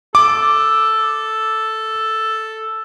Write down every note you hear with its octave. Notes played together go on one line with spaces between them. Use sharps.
A4 D6